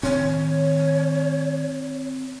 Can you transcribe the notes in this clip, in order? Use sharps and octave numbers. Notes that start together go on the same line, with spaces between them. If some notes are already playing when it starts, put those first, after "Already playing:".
A2 D#3 C4 C#5